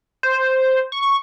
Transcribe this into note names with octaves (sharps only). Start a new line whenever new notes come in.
C5
C#6